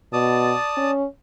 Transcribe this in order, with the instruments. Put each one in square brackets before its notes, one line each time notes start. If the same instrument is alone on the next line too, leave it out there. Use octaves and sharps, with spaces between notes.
[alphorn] B2 [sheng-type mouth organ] D5 A5 D#6
[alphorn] C#4